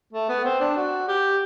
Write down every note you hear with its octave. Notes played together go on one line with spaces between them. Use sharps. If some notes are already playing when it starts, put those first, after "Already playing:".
A3
B3
C4
D4
F#4
G4